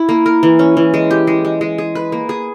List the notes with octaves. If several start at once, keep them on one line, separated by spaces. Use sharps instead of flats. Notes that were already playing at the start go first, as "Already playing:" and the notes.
Already playing: E4
A#3
A#4
E3
C#4
E3
G#3
G4
G#3
G#3
G#3
G#4
B4
A#3
G#4